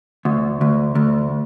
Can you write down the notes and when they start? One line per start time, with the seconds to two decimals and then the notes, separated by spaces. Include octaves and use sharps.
0.25 D2
0.61 D2
0.95 D2